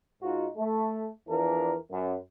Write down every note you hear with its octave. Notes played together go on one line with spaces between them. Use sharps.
G#2 D#4 F4 F#4
A3
E2 E3 F3 D4 A#4
F#2